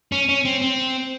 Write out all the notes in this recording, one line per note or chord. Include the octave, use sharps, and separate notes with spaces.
C#4
C#4
C4
C4